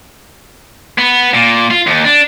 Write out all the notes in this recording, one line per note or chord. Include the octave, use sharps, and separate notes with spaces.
B3
A#2
F4
D#2
D4